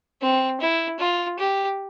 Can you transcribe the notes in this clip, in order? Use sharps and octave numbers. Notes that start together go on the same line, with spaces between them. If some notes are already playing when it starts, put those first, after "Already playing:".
C4
E4
F4
G4